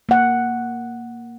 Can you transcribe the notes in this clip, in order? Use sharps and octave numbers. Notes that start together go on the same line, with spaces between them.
A#3 F#5